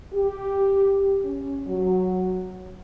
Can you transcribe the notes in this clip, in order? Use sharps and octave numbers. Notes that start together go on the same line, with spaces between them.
G4
C#4
F#3